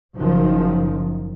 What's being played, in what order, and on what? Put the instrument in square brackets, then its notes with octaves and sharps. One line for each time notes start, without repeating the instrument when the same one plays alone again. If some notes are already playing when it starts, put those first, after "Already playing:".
[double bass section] F#1 F#2 D#3 F3